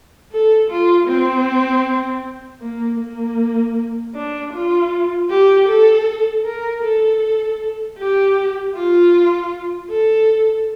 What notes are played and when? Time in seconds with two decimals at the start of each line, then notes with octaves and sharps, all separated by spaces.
0.32 A4
0.70 F4
1.08 C4
2.61 A#3
3.00 A#3
4.15 D4
4.53 F4
5.30 G4
5.69 A4
6.45 A#4
6.83 A4
7.98 G4
8.75 F4
9.90 A4